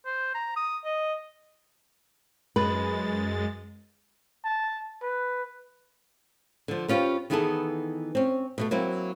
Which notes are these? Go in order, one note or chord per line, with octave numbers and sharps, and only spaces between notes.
C5
A#5
D#6
D#5
F#2 G#3 B4 A6
A5
B4
D3 F3
B3 C#4 F4 G4 B4 C5
D#3 E3 B3 E4 G#4 A4
C4 C#4
B2 G#3 A3
F#3 A#3 C4 E4